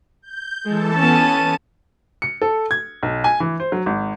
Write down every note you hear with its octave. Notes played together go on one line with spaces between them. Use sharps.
G6
E3 G#3 A4 A5
B3 C#4 A5 D#7
C#7
A4
G#6
B1
G#5
E3
C5
F#3
G#1